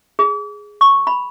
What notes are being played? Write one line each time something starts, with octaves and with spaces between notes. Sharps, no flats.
G#4
C#6
B5